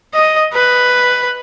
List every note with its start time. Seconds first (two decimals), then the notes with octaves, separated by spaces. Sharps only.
0.14 D#5
0.54 B4